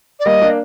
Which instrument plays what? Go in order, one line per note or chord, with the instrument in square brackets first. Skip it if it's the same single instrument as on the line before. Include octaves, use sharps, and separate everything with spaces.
[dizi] D5
[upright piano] G3 A#3 [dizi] D#5
[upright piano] A#3 D4